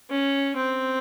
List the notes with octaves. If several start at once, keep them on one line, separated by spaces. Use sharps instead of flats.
C#4
C4